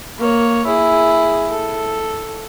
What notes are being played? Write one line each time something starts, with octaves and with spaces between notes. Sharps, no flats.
A#3 C#5
E4 G#4
A4